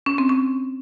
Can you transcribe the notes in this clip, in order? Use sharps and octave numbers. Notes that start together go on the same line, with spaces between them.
C#4
C4
C#4